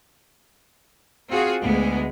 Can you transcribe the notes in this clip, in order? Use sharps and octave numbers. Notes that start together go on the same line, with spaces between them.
C4 F4 F#4 G#4
D2 G#3 A3 B3